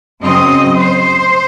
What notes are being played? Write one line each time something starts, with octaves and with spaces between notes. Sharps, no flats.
F#2 C#3 F#3 C4 D#5
C5